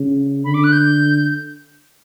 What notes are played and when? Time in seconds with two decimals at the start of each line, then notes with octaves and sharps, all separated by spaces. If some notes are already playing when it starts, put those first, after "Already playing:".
Already playing: C#3
0.44 D3 B5
0.54 D6
0.64 F#6
0.72 G6